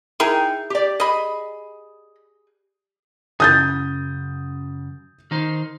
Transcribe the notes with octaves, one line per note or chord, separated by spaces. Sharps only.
D#4 E4 G#4 A#4 G5
G4 D5
G#4 D#5 B5
F#2 C#3 D#6 G6 A6
D#3 D#4 C5